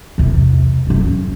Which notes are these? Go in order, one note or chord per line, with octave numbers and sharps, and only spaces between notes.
E2 C3
F#2 F#3